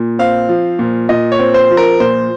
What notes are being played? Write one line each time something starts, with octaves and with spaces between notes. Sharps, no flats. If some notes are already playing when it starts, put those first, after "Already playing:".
Already playing: A#2
C4 F5
F3
A#2
A#2 D#5
C#5
C4
C5
F3
A#4
A#2 C5